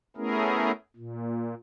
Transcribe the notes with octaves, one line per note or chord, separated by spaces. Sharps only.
A3 B3 C#4 E4 G#4 A#4
A#2